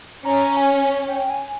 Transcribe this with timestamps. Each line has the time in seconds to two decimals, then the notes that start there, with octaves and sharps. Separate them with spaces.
0.25 C#4 A#5
0.57 G#5
1.08 G5
1.30 G#5